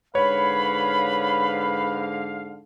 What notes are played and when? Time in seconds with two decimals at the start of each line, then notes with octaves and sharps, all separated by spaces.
0.15 G#2 D3 B4 C#5 F5 B5